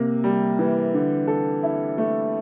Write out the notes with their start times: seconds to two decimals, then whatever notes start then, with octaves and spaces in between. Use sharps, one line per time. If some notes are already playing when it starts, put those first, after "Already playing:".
Already playing: C3 A#3
0.24 G3
0.59 E3
0.94 D3
1.27 A4
1.63 E4
1.98 A3